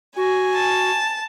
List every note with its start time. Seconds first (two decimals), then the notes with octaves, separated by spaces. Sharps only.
0.17 F#4 G#5
0.54 A5